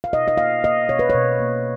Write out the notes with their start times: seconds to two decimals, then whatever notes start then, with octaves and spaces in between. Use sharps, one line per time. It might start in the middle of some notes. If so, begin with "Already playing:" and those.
0.04 F5
0.13 B2 D#5
0.28 D#5
0.38 A#3 F5
0.64 A#3 D#5
0.89 B2 C#5
0.99 B4
1.10 B2 C#5
1.40 A#3